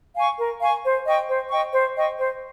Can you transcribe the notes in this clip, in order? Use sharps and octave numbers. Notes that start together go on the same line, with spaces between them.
F5 G#5 C#6
A#4
F5 G#5 C#6
C5
D#5 G5 C#6
C5
D#5 G5 C#6
C5
D#5 G5 C#6
C5